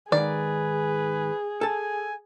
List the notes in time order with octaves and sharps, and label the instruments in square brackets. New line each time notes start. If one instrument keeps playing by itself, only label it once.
[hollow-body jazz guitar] G#2 D#3 [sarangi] G#4 [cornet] B4 [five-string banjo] D5
[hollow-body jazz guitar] A4 A5 [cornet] G#5